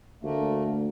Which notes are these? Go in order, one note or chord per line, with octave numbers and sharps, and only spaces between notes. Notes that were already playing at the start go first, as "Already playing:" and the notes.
D2 A3 A#3